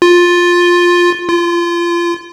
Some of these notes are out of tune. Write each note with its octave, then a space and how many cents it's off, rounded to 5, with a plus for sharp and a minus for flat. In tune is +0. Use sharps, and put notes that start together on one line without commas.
F4 +10
F4 -25